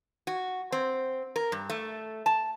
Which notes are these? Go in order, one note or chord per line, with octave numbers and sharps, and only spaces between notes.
F#4
C4
A#4
G2
A3
A5